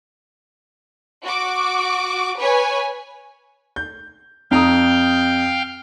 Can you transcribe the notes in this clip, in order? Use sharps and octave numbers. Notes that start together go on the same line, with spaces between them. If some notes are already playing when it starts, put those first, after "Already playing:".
F#4 D6
B4 C#5 G#5
G6
F2 F5 G5 A#5 D#6